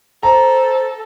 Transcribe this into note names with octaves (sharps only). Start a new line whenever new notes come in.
A4 C5 A#5